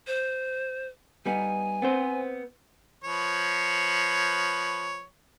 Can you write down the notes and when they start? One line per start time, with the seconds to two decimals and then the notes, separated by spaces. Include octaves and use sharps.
0.07 C5
1.26 G3 B3 D#4 G#5
1.82 B3 C4 C5
3.04 F3 B4 C#5